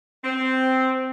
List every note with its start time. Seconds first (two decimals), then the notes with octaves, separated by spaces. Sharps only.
0.24 C4